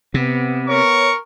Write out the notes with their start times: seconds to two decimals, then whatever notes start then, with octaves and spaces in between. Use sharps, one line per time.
0.14 C3 B3
0.68 B3 A#4 C#5 C#6